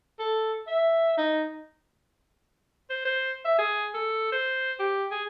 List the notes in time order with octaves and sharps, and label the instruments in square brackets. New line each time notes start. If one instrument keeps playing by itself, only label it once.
[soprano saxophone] A4
E5
D#4
[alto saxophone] C5
C5
E5
G#4
A4
C5
G4
G#4